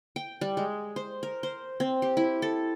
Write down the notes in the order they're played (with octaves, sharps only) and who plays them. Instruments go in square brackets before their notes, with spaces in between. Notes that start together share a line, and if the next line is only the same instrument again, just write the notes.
[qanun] G5
G3
G#3
C5
A#4
C5
C4
G4
E4
A4